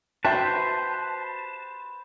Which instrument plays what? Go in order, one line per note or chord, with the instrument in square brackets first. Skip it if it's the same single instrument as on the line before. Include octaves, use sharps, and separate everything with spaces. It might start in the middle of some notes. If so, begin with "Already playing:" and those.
[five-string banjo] F#4 G4 E5 [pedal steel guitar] B4 C5 [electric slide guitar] A5